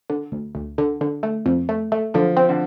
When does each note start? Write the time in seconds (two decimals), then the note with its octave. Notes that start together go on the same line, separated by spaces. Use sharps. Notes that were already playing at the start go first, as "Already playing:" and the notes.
0.10 D3
0.32 D2
0.55 D2
0.78 D3
1.01 D3
1.23 A3
1.46 F2
1.69 A3
1.92 A3
2.14 D3 F3
2.37 C4
2.49 D3